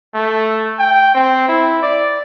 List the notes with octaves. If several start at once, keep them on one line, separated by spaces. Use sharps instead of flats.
A3
G5
C4
E4
D5